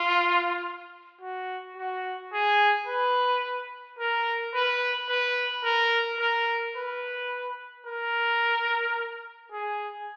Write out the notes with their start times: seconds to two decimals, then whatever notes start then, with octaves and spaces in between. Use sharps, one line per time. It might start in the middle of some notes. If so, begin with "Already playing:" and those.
Already playing: F4
1.21 F#4
1.77 F#4
2.33 G#4
2.87 B4
3.99 A#4
4.54 B4
5.09 B4
5.64 A#4
6.20 A#4
6.76 B4
7.86 A#4
9.52 G#4